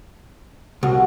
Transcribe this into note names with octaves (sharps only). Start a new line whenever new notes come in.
C2 F#4